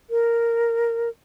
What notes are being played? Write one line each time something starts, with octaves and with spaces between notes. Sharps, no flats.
A#4